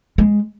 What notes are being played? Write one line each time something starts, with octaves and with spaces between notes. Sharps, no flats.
G#3